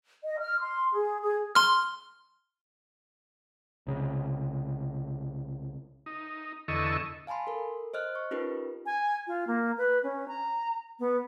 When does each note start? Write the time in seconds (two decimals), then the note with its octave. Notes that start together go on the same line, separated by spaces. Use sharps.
0.24 D#5
0.39 F6
0.61 C6
0.92 G#4
1.21 G#4
1.55 C6 F6
3.87 C2 C#3
6.06 D#4
6.68 E2 D3 A4 D#5 C#6 E6
7.27 F5 G#5 A5 B5 C6
7.47 A4 A#4
7.94 C5 D#5 F6 F#6
8.15 C#6
8.31 C#4 D#4 F4 G4 A#4 B4
8.86 G#5
9.27 F4
9.47 A#3
9.78 B4
10.03 C#4
10.28 A#5
10.99 B3